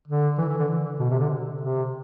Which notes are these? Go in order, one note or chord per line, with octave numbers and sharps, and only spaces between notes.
D3
E3
E3
D3
B2
C3
D3
C3